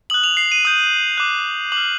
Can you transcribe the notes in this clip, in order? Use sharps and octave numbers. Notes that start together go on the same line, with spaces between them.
D#6 F#6 F#7
F7
C7
D#7
D#6 G6
D6 F#6
D6 F6 F#7